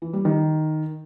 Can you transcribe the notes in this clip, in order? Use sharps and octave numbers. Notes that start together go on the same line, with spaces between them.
E3
G3
D#3